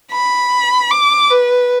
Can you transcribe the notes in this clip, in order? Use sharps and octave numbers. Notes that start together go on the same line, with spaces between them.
B5
D6
B4